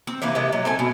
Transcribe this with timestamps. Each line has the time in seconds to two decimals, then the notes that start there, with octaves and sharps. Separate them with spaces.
0.07 C4
0.22 C3 E3 A#3 B4
0.35 C3 G#3
0.53 F#3
0.65 C4 A4 G#5
0.79 B2